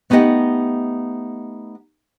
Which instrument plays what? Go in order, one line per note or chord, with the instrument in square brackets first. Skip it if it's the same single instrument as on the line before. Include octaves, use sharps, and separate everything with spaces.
[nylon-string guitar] A3 B3 D#4 G4 D#5 F#5